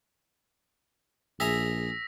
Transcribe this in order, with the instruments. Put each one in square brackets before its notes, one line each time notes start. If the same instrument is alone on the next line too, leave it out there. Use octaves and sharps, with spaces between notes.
[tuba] A#1 [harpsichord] G#4 E5 A#5 [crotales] E6 A#6 B6